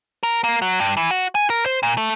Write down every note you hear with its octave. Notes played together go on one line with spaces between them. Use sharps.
A#4
A#3
F#3
G2
E3
F#4
G#5
A#4
C5
A#2
A3